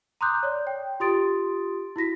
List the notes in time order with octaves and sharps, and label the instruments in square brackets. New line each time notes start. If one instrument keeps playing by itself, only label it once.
[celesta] A#5 C6 D6 D#6 F#6 G6
C#5 D5
G5
F4 G4 C6 D#6 A6 D7
E4 F#4 A#6 B6